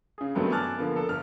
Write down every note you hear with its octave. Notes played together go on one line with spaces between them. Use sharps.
C#3 G#4
G2 D#3 F#3 A3 B3 C4
G#5 A5 D6 F6 F#6 A6
D3 F3 A#3 B3
A4 A#4
G1 F6